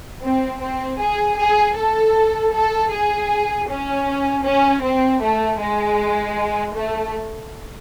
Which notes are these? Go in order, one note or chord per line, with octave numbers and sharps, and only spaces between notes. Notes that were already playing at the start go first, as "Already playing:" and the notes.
C4
C4
G#4
G#4
A4
A4
G#4
C#4
C#4
C4
A3
G#3
A3